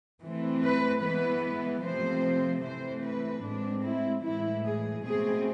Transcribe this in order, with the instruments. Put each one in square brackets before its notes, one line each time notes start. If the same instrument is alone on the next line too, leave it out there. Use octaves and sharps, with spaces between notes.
[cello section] E3 A3 C4
B4
E3 G#3 B3 B4
C3 F3 A3 C4 C5
E3 A3 C4 C5
B4
A2 G#3 C4 D4
E4
A2 E3 G#3 E4
G#4
B2 A3 C4 G#4